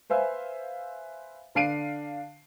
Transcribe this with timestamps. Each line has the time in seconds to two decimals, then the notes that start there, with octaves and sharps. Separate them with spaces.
0.10 B4 C5 E5 F5 G#5
1.55 D3 D4 F5 C7 D7 D#7